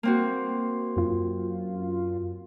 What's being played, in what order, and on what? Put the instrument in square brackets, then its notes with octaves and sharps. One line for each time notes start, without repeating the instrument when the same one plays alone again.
[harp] A#3 C4 F#4
[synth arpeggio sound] F#2 F4